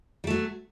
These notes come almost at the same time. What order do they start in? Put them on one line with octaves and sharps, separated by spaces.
G3 A3 F#3